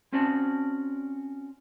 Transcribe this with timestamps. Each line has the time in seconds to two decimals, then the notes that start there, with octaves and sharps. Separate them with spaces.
0.13 C4 C#4 F#4 D5 A5